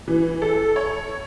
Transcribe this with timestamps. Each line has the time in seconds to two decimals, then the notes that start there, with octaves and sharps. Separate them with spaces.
0.08 E3
0.42 A4
0.76 C#5